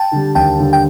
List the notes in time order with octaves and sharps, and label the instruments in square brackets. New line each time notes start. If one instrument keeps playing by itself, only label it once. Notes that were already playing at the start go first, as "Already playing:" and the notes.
Already playing: [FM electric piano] G5 A5
[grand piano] D3 G3
[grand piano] D#2 [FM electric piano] G5 A5
[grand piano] D3 G3
[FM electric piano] G5